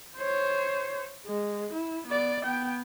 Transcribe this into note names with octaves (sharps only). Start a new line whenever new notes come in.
C5 C#5
G#3
E4
B3 D5
B3 G5